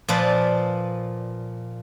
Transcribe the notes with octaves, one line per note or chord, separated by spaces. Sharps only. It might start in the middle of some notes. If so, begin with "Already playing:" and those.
A#2 F3 B4 D5